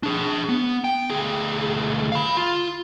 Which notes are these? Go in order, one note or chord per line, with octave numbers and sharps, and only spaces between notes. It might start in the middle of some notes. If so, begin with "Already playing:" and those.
D4 G#4
B3
G5
D2 G#4
F5 B5
F4